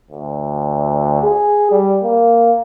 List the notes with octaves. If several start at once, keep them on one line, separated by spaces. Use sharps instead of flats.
D2
G#4
G3
A#3